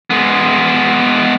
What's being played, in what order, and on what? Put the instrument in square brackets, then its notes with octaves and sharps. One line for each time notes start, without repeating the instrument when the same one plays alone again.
[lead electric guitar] G#3 B3